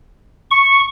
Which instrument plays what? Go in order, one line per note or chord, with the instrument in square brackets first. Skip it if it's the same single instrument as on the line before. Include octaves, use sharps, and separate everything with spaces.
[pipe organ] C#6